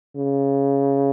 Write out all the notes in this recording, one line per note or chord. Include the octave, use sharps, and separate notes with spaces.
C#3